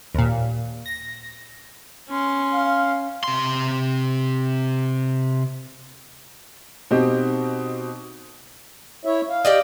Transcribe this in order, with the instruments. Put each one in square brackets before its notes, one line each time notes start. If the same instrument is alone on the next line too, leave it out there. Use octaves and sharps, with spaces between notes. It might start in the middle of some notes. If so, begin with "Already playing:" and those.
[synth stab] D#2 A#2
A#6
[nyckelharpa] C#4 C6
[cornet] F5
[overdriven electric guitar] C3 C6
[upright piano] B2 C4 D#4 G4
[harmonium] E4 C#5 E5
F5
[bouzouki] G4 D5 D#5